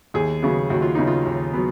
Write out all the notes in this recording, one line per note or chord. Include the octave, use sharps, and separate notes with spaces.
D#2 G#4
C#3 F#3 B3
D#2 F#4
F4
C#3 F#3 B3 D#4
F4
D#2
F#3 B3